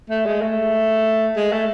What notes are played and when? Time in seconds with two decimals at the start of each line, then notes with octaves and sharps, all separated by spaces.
0.10 A3
0.26 G#3
0.42 A3
1.36 G#3
1.52 A3